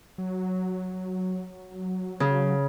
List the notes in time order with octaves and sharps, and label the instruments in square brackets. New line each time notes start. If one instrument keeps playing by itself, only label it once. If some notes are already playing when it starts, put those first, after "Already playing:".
[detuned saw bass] F#3
[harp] C#3